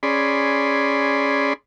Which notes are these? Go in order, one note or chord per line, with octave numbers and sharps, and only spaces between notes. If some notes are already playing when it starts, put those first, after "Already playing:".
C#4 G#4 D5 B5 C6